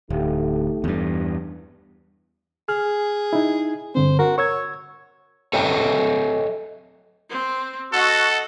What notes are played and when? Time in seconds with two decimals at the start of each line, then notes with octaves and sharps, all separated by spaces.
0.10 D1 A3 D#4 G4
0.84 E2 G2
2.69 G#4 F6
3.33 D#4 E4
3.95 G2 D3 C4 C5
4.19 F#4 A#4
4.38 C#5 C#6 E6 G#6
5.53 A4 C#5 D#5 E5 G5
7.30 C4
7.93 F#4 A4 D#5 F#5